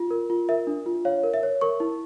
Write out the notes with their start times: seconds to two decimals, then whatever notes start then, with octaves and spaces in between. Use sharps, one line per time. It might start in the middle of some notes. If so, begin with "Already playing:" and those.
Already playing: F4
0.10 A#4
0.30 F4
0.49 A#4 E5
0.67 D4
0.86 F4
1.05 C#5 F5
1.24 A#4
1.34 E5
1.43 C#5
1.61 A#4 C#6
1.80 E4